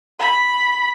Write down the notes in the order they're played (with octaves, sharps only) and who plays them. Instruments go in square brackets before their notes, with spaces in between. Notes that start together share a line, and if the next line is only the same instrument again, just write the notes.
[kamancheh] B5